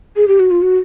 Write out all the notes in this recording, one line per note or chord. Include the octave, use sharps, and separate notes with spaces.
G#4
G4
F#4
F4
F#4